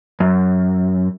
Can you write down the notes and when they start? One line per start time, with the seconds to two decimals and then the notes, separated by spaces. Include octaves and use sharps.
0.20 F#2